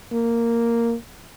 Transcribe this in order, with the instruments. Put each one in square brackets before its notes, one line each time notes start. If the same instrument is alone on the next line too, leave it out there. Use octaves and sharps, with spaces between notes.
[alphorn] A#3